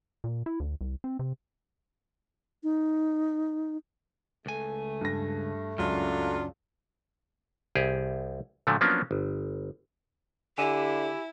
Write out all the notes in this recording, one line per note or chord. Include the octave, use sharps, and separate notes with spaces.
A#2
E4
D2
C2
C4
C3
D#4
C#2 A3 G#5
G2 A#6
C#2 F#2 C#3 F#3 D4 F4
C2 G4 G#4
A#2 D3 F3 F#3 A3
F3 F#3 A#3 B3 C#4 D4
G1
D3 E4 G4 G#5 D#7 E7